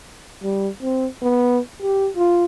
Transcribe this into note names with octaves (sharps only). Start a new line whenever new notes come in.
G3
C4
B3
G4
F4